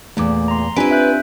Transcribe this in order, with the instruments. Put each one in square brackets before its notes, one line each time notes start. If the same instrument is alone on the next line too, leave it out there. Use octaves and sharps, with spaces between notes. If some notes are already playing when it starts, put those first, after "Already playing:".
[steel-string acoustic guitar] E2 A#2 [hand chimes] A3 D6
[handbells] A#5 C6
[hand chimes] C4 D4 G4 [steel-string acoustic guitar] E4 B4 [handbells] F4 G#5 D7
[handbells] E5 F#6 G6